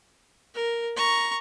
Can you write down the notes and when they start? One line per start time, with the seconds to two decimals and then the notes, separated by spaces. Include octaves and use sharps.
0.55 A#4
0.96 A#5 C#6